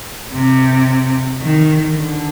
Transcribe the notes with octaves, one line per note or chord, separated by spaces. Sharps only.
C3
D#3
D3